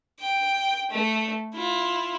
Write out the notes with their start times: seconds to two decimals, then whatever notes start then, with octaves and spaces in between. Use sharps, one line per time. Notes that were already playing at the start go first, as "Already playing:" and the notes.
0.20 G5
0.91 A3
1.54 E4 F4